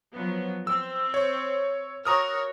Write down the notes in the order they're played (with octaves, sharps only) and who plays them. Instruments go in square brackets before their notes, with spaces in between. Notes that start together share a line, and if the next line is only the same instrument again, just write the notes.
[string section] F3 F#3 B3
[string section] C4 [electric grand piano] E6
[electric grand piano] C#5
[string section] F#4 A#4 C#5 [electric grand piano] A#5 D#6 F6